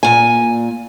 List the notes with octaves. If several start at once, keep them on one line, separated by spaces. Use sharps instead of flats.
A#2 G#5